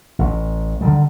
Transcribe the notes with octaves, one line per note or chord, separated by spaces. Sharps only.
A1
D3 D#3 G3